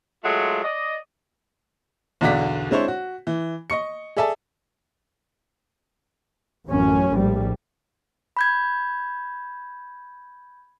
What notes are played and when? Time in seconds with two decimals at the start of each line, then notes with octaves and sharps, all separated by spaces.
0.24 F#3 G#3 A3 F4
0.64 D5 D#5
2.21 B1 E2 D3 F#4 D5 B6
2.71 G#3 C4 D4 E4 C5 C#5
2.88 F#4
3.27 E3
3.70 D#5 C#6 C#7
4.17 G#4 A4 D5 E5 G#5 A5
6.68 A1 F#2 C#4
7.12 A#1 A2 G3
8.37 B5 G6 G#6